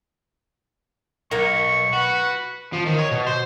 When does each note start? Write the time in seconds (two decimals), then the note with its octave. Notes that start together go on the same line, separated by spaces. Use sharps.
1.31 B1 A#3 A#4 C#6
1.93 F#4 B4
2.73 F3
2.86 D#3
2.99 C#5
3.11 B2
3.27 C5